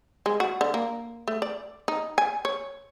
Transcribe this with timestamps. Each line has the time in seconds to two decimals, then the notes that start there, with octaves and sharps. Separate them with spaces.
0.26 G#3
0.40 F#4
0.61 D3
0.74 A#3
1.28 A3
1.42 D5
1.88 D#4
2.18 G#5
2.45 C#5